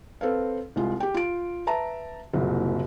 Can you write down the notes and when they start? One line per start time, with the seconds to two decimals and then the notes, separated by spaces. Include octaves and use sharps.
0.21 C4 A4 B4 F5
0.76 C2 G#3 F4
1.00 G4 G5
1.14 F4 D7
1.67 B4 E5 A5 A#5
2.33 F#1 C2 A#2 F#3